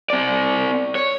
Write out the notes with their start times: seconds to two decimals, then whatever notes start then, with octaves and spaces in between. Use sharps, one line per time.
0.10 C4 D5
0.95 C#5